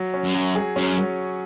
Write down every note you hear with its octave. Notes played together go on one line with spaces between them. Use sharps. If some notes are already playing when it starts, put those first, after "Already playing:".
Already playing: F#3
C#4
F#2
F#3
G#4
F#2 C#4
F#3